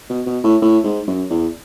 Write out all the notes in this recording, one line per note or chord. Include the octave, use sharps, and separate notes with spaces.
B2
B2
A2
A2
G#2
F#2
E2